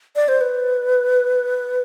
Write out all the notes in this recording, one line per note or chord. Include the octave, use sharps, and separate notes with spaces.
D5
C5
B4